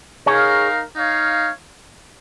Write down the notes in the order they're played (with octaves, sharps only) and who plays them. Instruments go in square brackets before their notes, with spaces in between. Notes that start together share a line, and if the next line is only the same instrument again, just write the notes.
[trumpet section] D#4 A#4 F5 [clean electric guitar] G#4 C#5
[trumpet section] D#4 C#5 F5